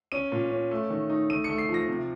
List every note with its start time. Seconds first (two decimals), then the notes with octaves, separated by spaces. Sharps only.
0.12 C#4 D#7
0.32 A#2
0.51 C#4
0.71 A3
0.90 D#3
1.09 D#4
1.30 A3 D#7
1.44 C#7
1.50 A3
1.58 C7
1.69 F3
1.74 A#6
1.88 C3